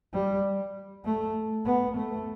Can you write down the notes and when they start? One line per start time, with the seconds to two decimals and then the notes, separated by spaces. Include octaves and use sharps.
0.14 G3
1.05 A3
1.66 B3
1.97 A3